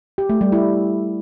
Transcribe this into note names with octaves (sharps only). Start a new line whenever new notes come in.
G4
A3
G3
E4